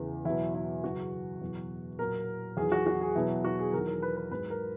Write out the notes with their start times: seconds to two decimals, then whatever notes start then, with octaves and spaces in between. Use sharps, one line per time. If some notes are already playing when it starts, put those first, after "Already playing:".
Already playing: E2 C#3 E3
0.25 E2 B2 F#3 E4
0.55 E4
0.83 F#2 C#3 E3 F#4
1.42 E2 B2 F#3
1.99 A#2 F#3 A#4
2.57 E2 D#3 F#3 G#4
2.72 F#4
2.86 F#4
3.01 G#4
3.16 E2 B2 F#3 E4
3.44 F#4
3.59 G#4
3.73 E2 D#3 F#3 A#4
3.88 A#4
4.02 B4
4.17 B4
4.31 G#2 F#3 B4
4.50 A#4